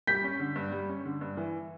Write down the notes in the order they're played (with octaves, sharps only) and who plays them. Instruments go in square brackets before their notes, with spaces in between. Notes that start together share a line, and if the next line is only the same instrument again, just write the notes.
[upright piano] G3 [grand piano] G6 B6
[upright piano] C#4
D3
G2
G3
C#4
D3
G2
E3